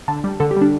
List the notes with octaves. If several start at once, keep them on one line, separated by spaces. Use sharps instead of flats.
D3 A5
G3
D3 A4
G4
G3
D4